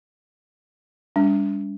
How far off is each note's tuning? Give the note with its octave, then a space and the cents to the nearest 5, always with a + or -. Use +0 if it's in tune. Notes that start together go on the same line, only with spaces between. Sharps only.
G3 +45 D4 -45